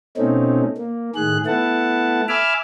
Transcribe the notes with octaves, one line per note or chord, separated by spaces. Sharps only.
B2 A3 C4 C#4 D#4
A#3
A2 D#3 G#4 F#6
A3 B3 E4 F#5 A5
E5 G#5 B5 D6 E6 F6